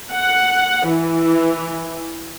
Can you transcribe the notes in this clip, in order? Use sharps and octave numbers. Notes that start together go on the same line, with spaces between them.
F#5
E3